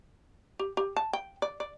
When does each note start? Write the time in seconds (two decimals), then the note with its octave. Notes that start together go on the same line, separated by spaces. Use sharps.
0.59 G4
0.77 G4
0.96 A5
1.13 G5
1.42 D5
1.60 D5